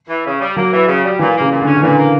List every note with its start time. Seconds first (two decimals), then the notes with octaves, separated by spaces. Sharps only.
0.09 E3
0.25 C#3
0.40 G3
0.56 F#3 A#3
0.73 E3
0.88 C#3
1.04 G3
1.19 A#2 E3
1.35 A#3
1.40 C#3
1.51 A#2
1.61 D3
1.66 C#4
1.77 D3
1.83 A#2 E3
1.98 A#3